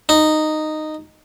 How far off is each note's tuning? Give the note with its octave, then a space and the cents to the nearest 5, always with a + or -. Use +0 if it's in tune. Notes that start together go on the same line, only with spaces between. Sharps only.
D#4 -10